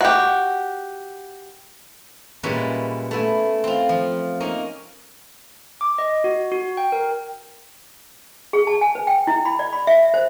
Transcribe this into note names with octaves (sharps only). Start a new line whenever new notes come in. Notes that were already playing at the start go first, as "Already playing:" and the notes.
F#4 G4
A#2 G3 G#3 C#4 E4 B4
A3 B3 E4 G#5
C4 F4
F3
A#3 C#4 D#4 A#4
D6
D#5
F#4
F#4
G5
A#4
G#4
A5
G#5
B4
G5
E4
B5
D5
B5
E5
C5